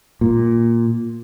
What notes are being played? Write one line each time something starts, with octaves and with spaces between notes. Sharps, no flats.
A#2